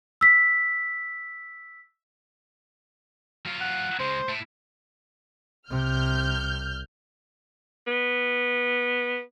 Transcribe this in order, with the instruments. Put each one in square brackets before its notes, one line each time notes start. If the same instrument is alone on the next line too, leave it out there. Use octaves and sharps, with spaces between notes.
[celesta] E6 B6
[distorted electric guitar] F#3 F4
[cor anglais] F#5
[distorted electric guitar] C#3 G#3 [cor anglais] C5
[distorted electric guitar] A3 E4
[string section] C2 F6 G6 [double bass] C3
[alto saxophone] B3